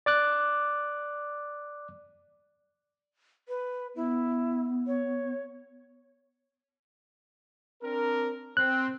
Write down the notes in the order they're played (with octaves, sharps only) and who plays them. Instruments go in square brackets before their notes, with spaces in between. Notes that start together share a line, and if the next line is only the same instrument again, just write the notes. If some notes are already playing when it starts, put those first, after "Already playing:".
[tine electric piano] D5 D6 F#6
[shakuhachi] B4
[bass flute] B3 [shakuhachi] E4
[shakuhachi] C#5
[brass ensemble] C4 D4 A#4
[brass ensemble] C4 [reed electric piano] F#6